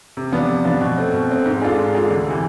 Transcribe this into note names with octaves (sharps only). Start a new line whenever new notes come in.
C3
F3 B3 D4
C3
F3 B3 D4
B2
A3 C4
B2
A3 C4
G#2
G#3 D4 F4 A4
G#2
G#3 D4 F4 A4
D2
C3 E3